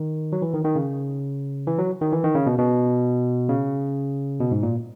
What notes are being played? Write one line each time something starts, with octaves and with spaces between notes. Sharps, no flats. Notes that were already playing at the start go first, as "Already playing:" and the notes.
Already playing: D#3
F#3
E3
D#3
D#3
C#3
E3
F#3
D#3
E3
D#3
C#3
B2
B2
C#3
B2
G#2
A#2